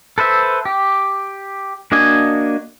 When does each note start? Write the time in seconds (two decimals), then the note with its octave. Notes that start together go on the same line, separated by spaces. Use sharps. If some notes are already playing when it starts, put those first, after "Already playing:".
0.18 A4 B4 C5 E5
0.65 G4
1.92 A#3 D4 F#4 D#5 G#5